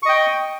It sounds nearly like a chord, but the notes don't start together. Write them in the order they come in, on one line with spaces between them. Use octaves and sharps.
C#6 D#5 G5